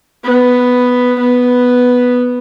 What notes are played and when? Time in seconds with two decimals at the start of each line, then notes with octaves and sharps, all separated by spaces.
0.25 B3
1.19 B3